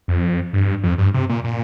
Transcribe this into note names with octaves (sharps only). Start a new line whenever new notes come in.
F2
G2
F2
G2
C3
A#2
A#2